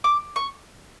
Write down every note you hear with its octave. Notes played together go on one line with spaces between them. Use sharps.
D6
C#6